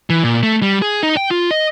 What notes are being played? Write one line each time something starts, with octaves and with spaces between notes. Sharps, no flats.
E3
A#2
A3
G3
G#4
D#4
G5
F4
D#5